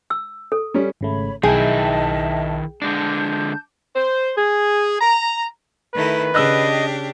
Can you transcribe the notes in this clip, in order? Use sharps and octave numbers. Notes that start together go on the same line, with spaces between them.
E6
A4
G3 C#4
G#1 C#3 A3 C#5 B5
B1 D#3 E4 G#4 D#5 E5 G5 A5
D3 G#3 D4 A5 D6 G6
C5
G#4
A#5
D#3 A3 E4 B4
C#3 D4 G4 D#5 E6 F#6